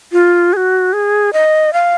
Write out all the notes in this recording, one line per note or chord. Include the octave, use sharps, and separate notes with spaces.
F4
G#4
F#4
G#4
D#5
F5